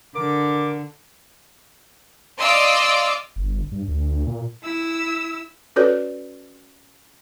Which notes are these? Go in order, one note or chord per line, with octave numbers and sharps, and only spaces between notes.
D3 A#4 D6
D5 D#5 F5 C6 D6 E6
G1
G2
D2
A#2
E4 E6
C#4 F#4 A4 B4 C#5 D5